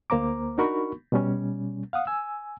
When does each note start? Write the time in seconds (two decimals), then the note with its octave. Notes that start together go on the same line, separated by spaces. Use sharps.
0.10 D2 A#3 C5 A#5 D6
0.58 D4 D#4 F#4 A#4 B5 C#6
1.12 B2 G3 C#4
1.93 F5 F#5 D#6
2.07 G#5 E6